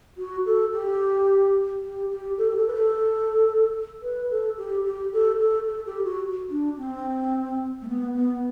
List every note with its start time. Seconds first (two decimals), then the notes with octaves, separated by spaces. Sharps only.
0.18 F#4
0.46 A4
0.73 G4
1.83 G4
2.11 G4
2.38 A4
2.50 G4
2.56 A4
2.68 B4
2.75 A4
4.02 B4
4.31 A4
4.58 G4
4.85 G4
5.13 A4
5.40 A4
5.68 A4
5.86 G4
6.05 F#4
6.50 D4
6.78 C4
7.82 A3
7.88 B3
8.15 B3